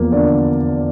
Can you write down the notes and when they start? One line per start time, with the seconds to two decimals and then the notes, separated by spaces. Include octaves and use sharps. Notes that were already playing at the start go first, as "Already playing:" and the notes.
Already playing: E2 F3 A#3
0.12 D3 D5